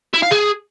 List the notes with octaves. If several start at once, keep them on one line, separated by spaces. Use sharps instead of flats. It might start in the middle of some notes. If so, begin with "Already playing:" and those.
E4
F5
G#4